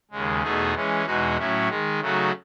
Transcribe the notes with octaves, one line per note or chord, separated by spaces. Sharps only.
D#2 C#3 G#3
E2 B2 A3 D#4 G#4
E3 G#3 C#4
E2 B2 G#3 D#4 F#4
A2 F#3 C#4 E4
D#3 G#3 D#4
C#3 F#3 A3 D#4 F#4